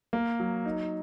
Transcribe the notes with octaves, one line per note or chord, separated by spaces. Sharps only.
A#3
F#3
D#4